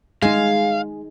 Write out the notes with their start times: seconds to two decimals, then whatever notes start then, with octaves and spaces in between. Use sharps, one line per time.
0.22 G#3 D#4 G#4 F5